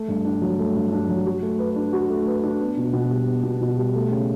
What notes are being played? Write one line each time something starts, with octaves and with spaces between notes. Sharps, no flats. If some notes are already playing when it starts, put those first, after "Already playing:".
Already playing: A3
G2
D4
F#3
A3
G2
D4
F#3
F#4
A3
B4
D4
F#4
A3
B4
D4
B3
B2
B2
G3
B3
B2
B2
G3
A3
C#3